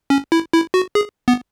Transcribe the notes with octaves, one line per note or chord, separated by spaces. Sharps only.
C#4
E4
E4
F#4
G#4
B3